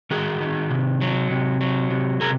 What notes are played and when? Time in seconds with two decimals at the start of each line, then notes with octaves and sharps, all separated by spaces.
0.11 D#3 F#4 G#4
0.41 D#3
0.70 C3
1.01 F#3
1.30 C3
1.61 F#3
1.90 C3
2.21 C3 G#4 A#4